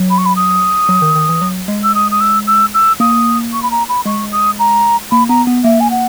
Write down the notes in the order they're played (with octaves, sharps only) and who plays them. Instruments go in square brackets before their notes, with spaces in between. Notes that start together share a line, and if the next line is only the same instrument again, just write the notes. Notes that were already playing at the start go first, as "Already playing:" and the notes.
Already playing: [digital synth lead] F#3
[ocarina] B5
C#6
B5
D#6
[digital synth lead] F#3
D#3
D#3
E3
F#3
G#3
[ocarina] E6
D#6
D#6
E6
E6
E6
[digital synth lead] A#3 [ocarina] D#6
[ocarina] C#6
B5
A#5
B5
[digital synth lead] G#3 [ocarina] C#6
[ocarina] D#6
A#5
[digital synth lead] A#3 [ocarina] B5
[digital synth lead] B3 [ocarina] A#5
[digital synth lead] B3
[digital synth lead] A#3 [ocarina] E5
[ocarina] G#5
F#5